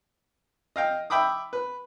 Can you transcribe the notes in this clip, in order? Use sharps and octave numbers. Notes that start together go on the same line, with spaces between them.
D#5 F5 G5
E5 G5 B5 D6 D#6
B4